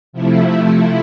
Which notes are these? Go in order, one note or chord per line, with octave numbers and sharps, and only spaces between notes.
C3 F3 A3 E4